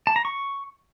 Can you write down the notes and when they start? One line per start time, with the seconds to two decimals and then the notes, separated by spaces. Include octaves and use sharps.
0.07 A5
0.16 A#5
0.25 C#6